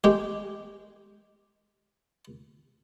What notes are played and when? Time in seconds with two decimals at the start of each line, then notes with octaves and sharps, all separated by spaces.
0.04 G#3 G4